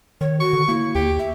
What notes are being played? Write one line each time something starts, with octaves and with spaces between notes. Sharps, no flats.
D#3 C#5
F#4 C#6
D3
A#3 E4
D#2 G4
E5